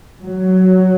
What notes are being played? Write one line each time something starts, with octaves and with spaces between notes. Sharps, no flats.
F#3